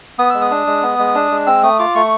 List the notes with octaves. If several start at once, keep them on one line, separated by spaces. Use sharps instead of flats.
B3 D#6
G#3 E6
D#6
D4
G#3
B3
G#3
D4
G#3
C4 E6
A3 D#6
F4 D6
A3 C#6